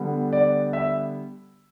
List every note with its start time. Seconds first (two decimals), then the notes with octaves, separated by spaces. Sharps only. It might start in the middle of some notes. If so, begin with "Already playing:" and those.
Already playing: D3 G3 B3
0.33 D5
0.73 E5